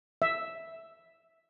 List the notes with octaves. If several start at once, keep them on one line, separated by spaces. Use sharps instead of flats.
E5